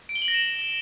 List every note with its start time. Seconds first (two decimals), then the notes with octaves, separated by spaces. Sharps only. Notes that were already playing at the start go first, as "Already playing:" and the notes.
0.09 D7
0.15 G7
0.22 F#7
0.28 A#6
0.34 E7